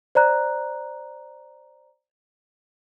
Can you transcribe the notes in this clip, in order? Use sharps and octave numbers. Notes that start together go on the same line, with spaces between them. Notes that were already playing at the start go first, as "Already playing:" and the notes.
C5 D5 A#5 F#6